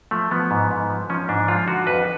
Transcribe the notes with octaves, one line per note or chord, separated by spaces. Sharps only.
F3 A3
F3 B3
G#2
G#2
F3
F3 C#4
G#2 D4
F3 F4
D3 F#4
F2 B4